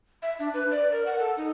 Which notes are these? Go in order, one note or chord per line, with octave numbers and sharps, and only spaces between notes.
E5
D4
B4
D5
A#4
F#5
A4
D#4